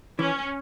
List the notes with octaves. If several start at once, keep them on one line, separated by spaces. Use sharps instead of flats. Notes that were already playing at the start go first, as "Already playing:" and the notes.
E3 C#4